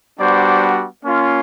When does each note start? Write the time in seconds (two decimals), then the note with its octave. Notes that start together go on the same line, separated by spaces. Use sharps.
0.19 G3 B3 D4 F#4 C5 D5
1.03 A#3 C#4 F4